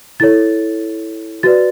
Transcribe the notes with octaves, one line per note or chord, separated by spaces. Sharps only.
E4 A4 C#5 A6
F#4 B4 D5 A6